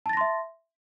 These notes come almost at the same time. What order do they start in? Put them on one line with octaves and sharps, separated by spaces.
A5 A6 A#6 C6 E5